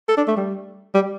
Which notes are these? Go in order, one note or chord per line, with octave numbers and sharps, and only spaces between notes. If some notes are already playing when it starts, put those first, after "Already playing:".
A4
D4
A3
G3
G3